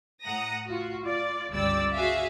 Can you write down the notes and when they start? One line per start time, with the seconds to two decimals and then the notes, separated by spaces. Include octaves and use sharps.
0.23 A2 F#5 A#5 D#6 A#6
0.66 F4 F#4
1.03 F4 D5
1.52 G1 C#2 G3 D5 E6
1.94 F#4 G#4 E5 F5